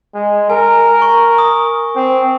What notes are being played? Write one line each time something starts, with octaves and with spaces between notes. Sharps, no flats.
G#3
A#4 G#5
C#6
D#6
C4